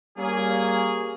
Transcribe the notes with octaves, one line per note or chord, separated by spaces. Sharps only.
G3 A#3 C#4 G#4